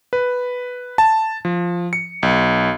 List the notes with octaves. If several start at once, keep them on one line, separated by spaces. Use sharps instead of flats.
B4
A5
F3
C#7
B1